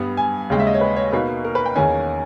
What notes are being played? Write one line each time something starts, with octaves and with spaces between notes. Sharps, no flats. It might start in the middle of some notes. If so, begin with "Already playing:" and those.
Already playing: G2 G3 B3
G#5
D#2 C#3 G#3 G5
E5
D#5
C#5
B4
C#5
B2 A#3 D#4 B4
A#4
B4
G5
E2 D#3 A#3 C#4 G#5